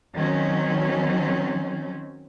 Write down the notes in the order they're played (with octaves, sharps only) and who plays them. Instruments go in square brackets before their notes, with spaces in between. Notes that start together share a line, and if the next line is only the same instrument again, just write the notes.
[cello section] D#3 F#3 C4 C#4